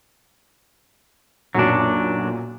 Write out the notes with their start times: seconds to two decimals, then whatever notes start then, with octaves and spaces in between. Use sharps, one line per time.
1.55 B1 F#2 A#2 F#3 D4